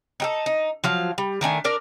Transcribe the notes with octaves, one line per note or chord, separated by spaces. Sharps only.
D#4 G4 A4
D#4
F3 F#3 F5
G3
D#3 A3 D4 G#5
D4 A#4 D5